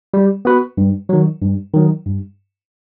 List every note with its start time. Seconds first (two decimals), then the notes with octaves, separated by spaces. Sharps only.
0.14 G3
0.45 B3 F#4 B4
0.77 G2
1.09 D#3 F#3
1.42 G2
1.74 D#3 F#3
2.06 G2